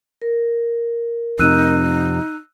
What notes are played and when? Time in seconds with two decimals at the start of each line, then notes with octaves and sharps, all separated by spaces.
0.22 A#4
1.39 F2 C3 D#4 E6 F#6 D#7